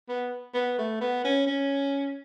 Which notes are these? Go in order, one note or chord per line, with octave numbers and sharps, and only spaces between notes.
B3
B3
A3
B3
C#4
C#4